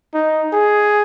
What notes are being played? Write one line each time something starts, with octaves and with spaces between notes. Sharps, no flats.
D#4
G#4